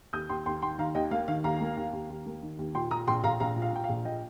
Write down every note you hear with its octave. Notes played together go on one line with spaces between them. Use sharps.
D#2 D#6 G6
D#2 G5 C6
D#2 G5 C6
D#3 G5 C6
D#3 F5 A#5
D#2 D#5 G5
A#3 F5
D#3 F5
D#2 F5 A#5
A#3
D#2
D#2
D#2
A#3
D#3
D#2
A#2 G5 C6
A#2 A#5 D#6
A#1 G5 C6
A#1 F5 A#5
A#1 F5 A#5
A#2
F5
A#2 G5
F5
A#1
A#2 D#5 G5